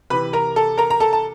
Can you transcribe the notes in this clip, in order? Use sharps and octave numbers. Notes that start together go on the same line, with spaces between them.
C3 E3 B4 B5
A#4 A#5
A4 A5
A#4 A#5
A#5
A4 A5
A5